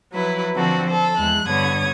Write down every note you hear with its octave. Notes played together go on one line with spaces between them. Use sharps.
F3 F#3 E4 B4
D3 F3 C4 F#4 A4
A4 C5
E2 G#3 F#6
G2 D3 B3 C#5 D#6 G#6